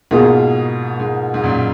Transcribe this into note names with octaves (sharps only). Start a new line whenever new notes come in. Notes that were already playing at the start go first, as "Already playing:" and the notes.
G#2 B2 A#3 F4 G#4
G#2
G#2
F#2 A#2